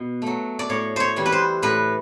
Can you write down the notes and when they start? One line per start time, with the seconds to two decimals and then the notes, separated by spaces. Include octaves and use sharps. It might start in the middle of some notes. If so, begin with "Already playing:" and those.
Already playing: B2
0.22 F#3 A3
0.59 D5
0.69 A2 C#5
0.96 C5 C#5
1.16 E3 G3
1.26 B4
1.32 C5
1.63 A2 B4